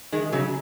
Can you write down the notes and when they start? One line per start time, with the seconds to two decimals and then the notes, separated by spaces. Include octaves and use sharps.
0.12 D#3 G#3
0.32 C#3 F#3